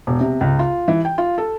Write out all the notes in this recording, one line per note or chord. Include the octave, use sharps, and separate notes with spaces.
E1
C3
C#2
F4
E3
G5
F4
A4